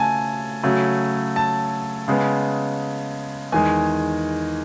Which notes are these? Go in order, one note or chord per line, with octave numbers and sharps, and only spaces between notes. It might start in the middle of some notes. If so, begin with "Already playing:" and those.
Already playing: C#3 A3 G#5 A5
C#3 F#3 A3
A5
C#3 G#3 B3
E2 D#3 G#3 G#5